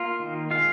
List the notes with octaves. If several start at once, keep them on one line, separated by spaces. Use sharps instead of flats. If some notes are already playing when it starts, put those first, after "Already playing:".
Already playing: A#3 F4
D#3
G#3 F4 F5